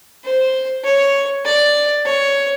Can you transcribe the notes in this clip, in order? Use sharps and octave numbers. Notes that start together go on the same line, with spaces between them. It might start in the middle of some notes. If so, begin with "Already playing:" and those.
C5
C#5
D5
C#5